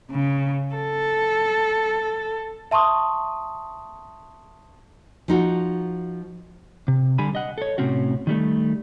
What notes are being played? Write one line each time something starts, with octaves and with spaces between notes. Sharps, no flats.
C#3
A4
E5 A5 C6 C#6 D#6
F3 D#4 F#4
C3
D3 G3 G#5 B5
D#5 F#5
A4 C#5
A2 C3 F3 C4 C#4 F#4
D#3 G3 A3